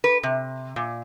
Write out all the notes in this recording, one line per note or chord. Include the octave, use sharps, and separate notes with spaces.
B4
C3
A#2